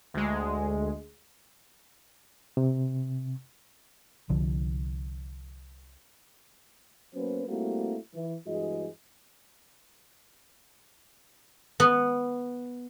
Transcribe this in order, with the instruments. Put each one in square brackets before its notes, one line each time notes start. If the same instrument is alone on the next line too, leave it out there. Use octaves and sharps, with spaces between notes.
[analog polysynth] D2 G#3
[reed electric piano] C3
[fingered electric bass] C2 D3 F3
[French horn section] F#3 A#3 B3 C#4 B4 C5
G3 A3 A#3 C4 E4 F#4
E3
G2 E3 G#3 F#4 G#4 D#5
[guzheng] B3